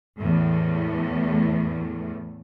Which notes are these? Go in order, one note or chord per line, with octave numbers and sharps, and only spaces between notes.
E2 A2